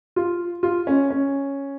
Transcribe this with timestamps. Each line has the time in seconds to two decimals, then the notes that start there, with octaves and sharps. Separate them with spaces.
0.16 F4
0.63 F4
0.87 C#4
1.10 C#4